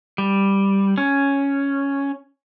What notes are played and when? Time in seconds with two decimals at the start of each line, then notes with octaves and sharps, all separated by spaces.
0.18 G3
0.98 C#4